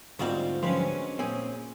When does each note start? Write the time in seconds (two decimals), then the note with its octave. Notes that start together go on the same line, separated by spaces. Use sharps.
0.19 D2 G#2 G3 C4 F4 F#4
0.63 C3 F3 F#3 G#3 C#4 D4 B4
1.19 A#2 C4 C#4 G#4